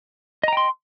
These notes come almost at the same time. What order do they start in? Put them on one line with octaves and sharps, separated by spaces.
D#5 A#5 G5 C6